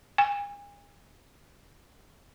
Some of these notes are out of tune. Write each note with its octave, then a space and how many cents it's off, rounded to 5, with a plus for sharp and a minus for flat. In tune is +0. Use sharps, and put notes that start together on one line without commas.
G#5 -40